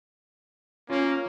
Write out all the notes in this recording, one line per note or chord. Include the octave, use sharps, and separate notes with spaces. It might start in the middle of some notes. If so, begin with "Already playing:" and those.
A#3 C#4 F4 A#4